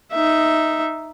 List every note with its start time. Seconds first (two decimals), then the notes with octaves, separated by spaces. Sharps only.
0.12 D#4 E5